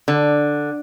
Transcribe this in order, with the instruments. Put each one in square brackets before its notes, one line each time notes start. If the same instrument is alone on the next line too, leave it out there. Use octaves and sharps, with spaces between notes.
[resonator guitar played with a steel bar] D3